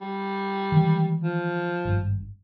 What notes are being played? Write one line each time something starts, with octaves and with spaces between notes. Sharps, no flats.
G3
D#3 E3 G#3
F3
G#1 G2